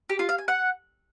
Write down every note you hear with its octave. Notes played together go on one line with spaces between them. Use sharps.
G4
F4
F5
G#5
F#5